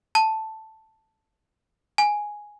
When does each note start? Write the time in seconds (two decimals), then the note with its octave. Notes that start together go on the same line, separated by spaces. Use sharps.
0.15 A5
1.98 G#5